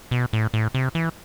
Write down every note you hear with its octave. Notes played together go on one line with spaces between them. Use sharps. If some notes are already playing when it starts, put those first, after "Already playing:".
B2
A2
A2
C3
E3